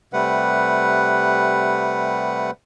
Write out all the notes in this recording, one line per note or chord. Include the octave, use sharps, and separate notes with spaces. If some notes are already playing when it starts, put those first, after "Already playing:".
C3 G3 A3 B4 F#5